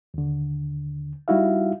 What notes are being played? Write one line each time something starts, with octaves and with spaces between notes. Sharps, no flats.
D#2 D3
G3 D#4 E4 F#4 E5 F5